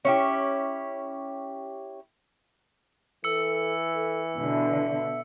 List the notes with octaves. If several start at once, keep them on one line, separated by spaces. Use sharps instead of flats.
C#4 E4 G4
E3 A4 E6 C#7
A4
B2 D3 E5